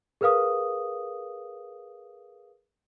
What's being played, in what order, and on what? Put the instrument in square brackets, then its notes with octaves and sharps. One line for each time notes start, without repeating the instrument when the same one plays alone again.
[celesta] G#4 A#4 B4 F5 D#6